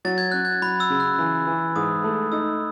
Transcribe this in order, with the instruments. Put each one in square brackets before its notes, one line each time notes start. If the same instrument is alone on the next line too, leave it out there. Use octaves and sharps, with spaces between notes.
[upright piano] F#3 [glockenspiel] A6
[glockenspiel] G#6
[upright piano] C#4 [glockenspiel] F#6
[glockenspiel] G#6
[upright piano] F#3 [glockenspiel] B5
[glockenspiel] E6
[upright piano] C#3
[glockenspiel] F#6
[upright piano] E3
E3
[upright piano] G#2 [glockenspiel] D#6
[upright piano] A3
[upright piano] D#4 [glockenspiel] E6